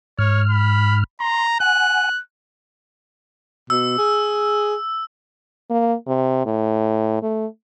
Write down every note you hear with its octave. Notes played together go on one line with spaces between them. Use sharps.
G#2 C#5 F6
B5
A#5 C6
F#5 G#5 F#6
B2 E6
G#4
A#3
C3
A2
A3